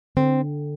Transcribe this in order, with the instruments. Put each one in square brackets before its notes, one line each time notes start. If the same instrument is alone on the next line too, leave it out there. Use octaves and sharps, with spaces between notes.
[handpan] D3 [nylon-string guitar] C4